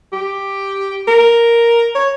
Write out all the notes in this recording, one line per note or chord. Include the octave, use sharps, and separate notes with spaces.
G4
A#4
C#5